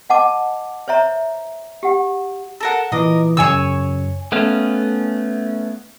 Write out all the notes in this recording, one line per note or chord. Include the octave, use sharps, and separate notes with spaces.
D#5 F#5 A5 D6
C5 C#5 E5 A#5
G4 F#5
A4 A#4 F#5
A#2 E3 A#4 D#5 D6
F#2 C#3 C#5 G#5 E6
A3 B3 C#4 F5